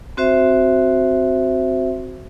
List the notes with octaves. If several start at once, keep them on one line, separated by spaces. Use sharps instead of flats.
C4 F#4 C5 E5